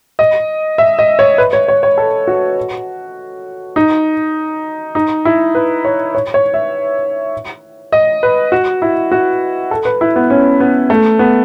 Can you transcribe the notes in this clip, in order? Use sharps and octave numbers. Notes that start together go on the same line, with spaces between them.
D#5
E5
D#5
C#5
B4
C#5
C#5
C#5
A4
F#4
D#4
D#4
E4
B4
C#5
C#5
C#5
E5
D#5
B4
F#4
E4
F#4
A4
B4
E4
B3
C#4
B3
A3
B3